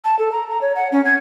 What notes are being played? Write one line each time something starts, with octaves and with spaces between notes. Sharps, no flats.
A5
A4
A#5
A#5
C#5
F#5
C#4
G#6